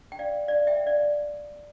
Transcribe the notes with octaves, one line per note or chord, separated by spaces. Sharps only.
G5
D5 F5
D5 F5
E5 G5
D5 F5